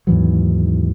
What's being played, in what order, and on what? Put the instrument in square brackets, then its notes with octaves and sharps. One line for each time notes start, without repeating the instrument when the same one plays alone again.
[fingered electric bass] D#2 G#2 E3 F#3